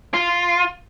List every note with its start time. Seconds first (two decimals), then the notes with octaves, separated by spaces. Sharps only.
0.14 F4